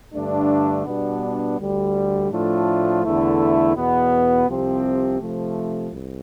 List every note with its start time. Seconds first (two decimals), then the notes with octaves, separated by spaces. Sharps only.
0.14 G2 D3 A3 D4
0.87 B2 G3 B3 D4
1.59 D2 D3 G3
2.31 A2 F3 A3 D4 F4
3.04 E2 D3 A3 E4
3.76 E2 B2 B3
4.48 C2 C3 F3 C4 G4
5.20 C3 F3 A3
5.92 C2